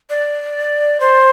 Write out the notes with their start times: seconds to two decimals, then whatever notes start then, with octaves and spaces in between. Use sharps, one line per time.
0.10 D5
1.00 C5